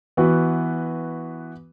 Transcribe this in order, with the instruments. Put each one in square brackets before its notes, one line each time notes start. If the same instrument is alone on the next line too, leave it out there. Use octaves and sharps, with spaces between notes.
[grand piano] E3 B3 F#4 B4